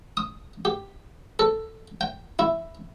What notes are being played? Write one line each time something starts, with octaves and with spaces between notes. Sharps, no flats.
D#6
G4
A4
G5
E4